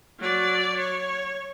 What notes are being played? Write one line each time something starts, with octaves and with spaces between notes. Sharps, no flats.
F#3 D5
C#5